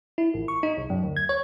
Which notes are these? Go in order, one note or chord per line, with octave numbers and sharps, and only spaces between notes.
E4
A1
C#6
D#4
C2
F#2
D2
G#6
C#5